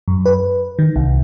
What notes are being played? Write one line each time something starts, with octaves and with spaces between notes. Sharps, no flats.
F#2
B4
D#3
C2